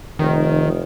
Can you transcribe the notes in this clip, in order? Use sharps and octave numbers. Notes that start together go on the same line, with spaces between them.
F1 D#3